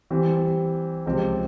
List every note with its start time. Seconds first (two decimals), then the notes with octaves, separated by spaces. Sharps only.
0.11 E3 G3 C4 G4
1.06 C#2 C3 F3 C4 G4